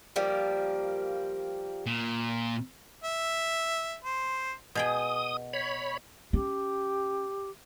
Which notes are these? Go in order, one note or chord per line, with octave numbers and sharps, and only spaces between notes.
F3 G3 A#3
A#2
E5
C5
B2 G#4 G5 D#6
C#5 B5
C#4 G4